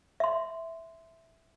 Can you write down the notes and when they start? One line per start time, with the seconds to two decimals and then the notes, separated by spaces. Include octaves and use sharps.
0.20 E5 C6